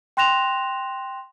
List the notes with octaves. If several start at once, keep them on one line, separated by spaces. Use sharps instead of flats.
G5 C6 F#6 A#6 E7 F7